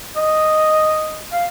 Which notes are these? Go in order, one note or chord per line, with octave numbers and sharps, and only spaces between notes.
D#5
F5